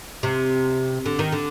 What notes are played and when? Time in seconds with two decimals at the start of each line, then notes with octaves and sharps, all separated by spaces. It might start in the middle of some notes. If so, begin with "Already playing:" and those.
0.23 C3
1.06 D3
1.19 D#3
1.32 D3